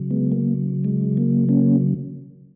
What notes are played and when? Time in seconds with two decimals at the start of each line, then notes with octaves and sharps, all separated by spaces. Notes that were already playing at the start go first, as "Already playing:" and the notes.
Already playing: C#3 F#3
0.11 G#3 B3
0.32 A#3
0.85 G#3
1.17 A#3
1.49 A#3 C#4